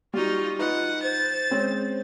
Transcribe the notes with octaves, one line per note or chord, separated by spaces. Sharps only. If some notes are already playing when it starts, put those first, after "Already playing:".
G3 D#4 F4 F#4
D#4 F4 B4 D#5 F#5
C5 A6
G#3 C4 C#4